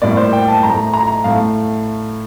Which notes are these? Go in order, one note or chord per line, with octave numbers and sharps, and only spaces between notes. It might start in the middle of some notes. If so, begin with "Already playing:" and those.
A2 G3 A#3 D5
C5
G5
A5
A2 A3 A#5
A#5
A2 A3 F5